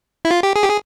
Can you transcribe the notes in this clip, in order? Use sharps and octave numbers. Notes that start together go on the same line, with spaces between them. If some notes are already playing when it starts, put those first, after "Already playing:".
E4
F4
G4
G#4
G4
G#4